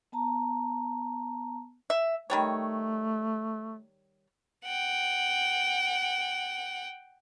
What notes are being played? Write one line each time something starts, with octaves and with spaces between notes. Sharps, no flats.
B3 A5 A#5
E5
D#3 G3 A3 C#5
F#5 G5